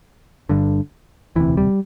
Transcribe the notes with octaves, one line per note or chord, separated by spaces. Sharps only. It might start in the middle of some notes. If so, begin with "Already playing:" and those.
G1 G2 D3
E1 D2 C3 E3
G3